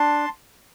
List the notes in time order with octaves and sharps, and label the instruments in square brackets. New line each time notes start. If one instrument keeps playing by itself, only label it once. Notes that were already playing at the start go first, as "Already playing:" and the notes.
Already playing: [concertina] D4 A5 C6